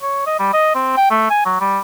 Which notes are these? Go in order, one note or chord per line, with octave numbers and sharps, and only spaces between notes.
C#5
D#5
G3
D#5
C4
G5
A3
G#5
F#3
G3